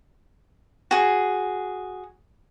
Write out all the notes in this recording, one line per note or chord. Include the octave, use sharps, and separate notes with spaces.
F#4 G#4